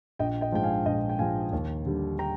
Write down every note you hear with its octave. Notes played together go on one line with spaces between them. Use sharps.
A#1 D#5 G5
D#5 G5
G#2 F3 G5
F5 G#5
A#1 D#5 G5
G5
G#2 F3 F5 G#5
D#2
D3 G3
G5 A#5